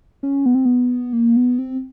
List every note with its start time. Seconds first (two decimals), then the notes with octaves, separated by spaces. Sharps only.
0.23 C#4
0.46 B3
0.55 C4
0.65 B3
1.13 A#3
1.36 B3
1.59 C4